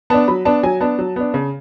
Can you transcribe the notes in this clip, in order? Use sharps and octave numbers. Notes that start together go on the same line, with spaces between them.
B3 D4 A5
F#3 B5
B3 D4 A5
F#3 G#5
B3 D4 A5
F#3
B3 D4
C#3